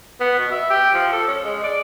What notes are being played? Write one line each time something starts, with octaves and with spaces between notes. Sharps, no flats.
B3
B2
E5
G4
F3
A4
C#4
G#3
D5